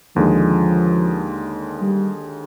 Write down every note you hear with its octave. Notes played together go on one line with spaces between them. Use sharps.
D#2 D3 F3 G#3
G3